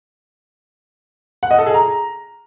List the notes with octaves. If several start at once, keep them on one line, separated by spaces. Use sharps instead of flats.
F#5
D#5
A4
G#4
A#5